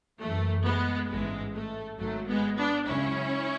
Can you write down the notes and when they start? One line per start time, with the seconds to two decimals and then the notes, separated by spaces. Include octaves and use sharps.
0.21 F#2 E3 A3
0.65 G#3 B3
1.09 A1 G#2 E3 G#3
1.54 A3
1.98 G#1 G#2 F#3 A3
2.28 G#3 B3
2.57 B3 D4
2.87 C#2 C#3 F#3 C#4 E4